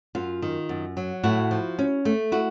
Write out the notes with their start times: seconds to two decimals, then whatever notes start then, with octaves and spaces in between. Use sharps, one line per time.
0.15 F#2 F4
0.42 D#3
0.69 F#2
0.97 F#3
1.23 A2 E4 F#4
1.51 F3
1.79 C#4
2.05 A3
2.32 E4 F#4